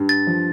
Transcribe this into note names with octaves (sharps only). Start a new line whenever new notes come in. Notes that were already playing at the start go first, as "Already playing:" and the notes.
Already playing: G2
A6
F3